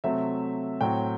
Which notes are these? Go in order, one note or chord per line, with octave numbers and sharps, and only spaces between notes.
C3 F#3 A3 C4 E5
A2 F#3 C4 G5